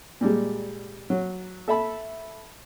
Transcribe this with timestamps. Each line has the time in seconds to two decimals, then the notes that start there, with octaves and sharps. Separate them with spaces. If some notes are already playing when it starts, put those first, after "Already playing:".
0.21 A#2 G3 G#3
1.10 F#3
1.68 A4 E5 A5 B5